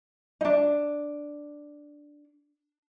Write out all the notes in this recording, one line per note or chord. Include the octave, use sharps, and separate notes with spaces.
D4 D#4